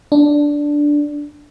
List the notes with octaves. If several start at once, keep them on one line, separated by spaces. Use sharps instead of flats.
D4